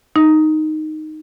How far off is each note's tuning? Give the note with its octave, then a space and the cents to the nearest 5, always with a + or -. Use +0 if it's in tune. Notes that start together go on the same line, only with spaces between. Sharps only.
D#4 -5